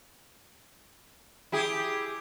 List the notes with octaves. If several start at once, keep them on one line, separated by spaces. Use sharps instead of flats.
E4 G4 G#4